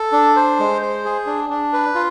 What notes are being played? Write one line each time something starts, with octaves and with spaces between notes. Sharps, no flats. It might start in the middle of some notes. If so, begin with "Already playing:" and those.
Already playing: A4
D4
C5
G#3
C5
G#4
D4
D4
B4
F4